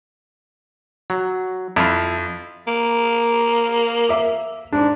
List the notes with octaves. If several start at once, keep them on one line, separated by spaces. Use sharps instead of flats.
F#3
F2 E4 F4
A#3
E5 D6
G#2 D4